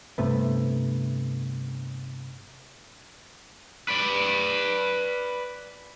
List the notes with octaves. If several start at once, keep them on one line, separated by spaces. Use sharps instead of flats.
G2 C3 A3 B3
B4 D5